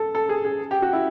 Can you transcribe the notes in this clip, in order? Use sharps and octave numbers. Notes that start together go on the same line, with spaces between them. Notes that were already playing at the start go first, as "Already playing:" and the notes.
Already playing: A4
A4
G#4
G#4
G4
F#4
E4